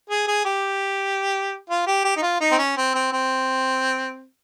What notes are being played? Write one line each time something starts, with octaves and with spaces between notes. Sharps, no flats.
G#4
G#4
G4
F4
G4
G4
D#4
F4
D#4
C4
C#4
C4
C4
C4